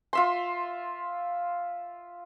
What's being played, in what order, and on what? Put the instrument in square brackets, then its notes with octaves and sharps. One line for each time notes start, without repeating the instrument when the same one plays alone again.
[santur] F4 E5 C6